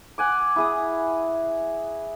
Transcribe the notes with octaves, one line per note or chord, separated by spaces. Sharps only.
F#5 G#5 D6
E4 G#4 D#6